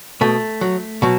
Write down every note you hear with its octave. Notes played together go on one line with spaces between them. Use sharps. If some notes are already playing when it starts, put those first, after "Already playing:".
B2 A3
F#3
B2 F#3